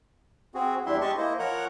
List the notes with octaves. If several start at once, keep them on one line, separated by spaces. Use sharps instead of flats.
C4 F#4 G#4
E2 G3 D4 E4 E5 C6
G#3 G4 D#5 A5 C6 C#6
A#3 E4 C5 D#5
F3 A#4 C#5 F#5 A#5 F#6